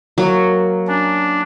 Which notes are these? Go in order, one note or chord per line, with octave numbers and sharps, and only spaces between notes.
F#3 A#3
C#4 D4